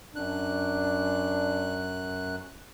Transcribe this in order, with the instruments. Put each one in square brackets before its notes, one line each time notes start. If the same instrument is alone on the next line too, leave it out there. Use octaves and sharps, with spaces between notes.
[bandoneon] F#2 F#6 [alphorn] D4